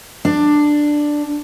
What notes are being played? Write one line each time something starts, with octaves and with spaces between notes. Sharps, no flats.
D4